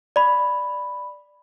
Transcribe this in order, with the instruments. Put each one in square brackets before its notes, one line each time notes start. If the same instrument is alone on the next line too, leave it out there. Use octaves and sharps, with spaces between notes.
[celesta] D5 B5